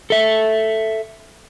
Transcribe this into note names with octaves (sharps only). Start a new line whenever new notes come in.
A4 E5